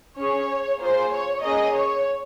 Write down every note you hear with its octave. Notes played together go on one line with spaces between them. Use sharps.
C#4 G#4 C#5
A#3 F4 G#4 C5
C#5
A#3 C#4 G#4 D#5
C#5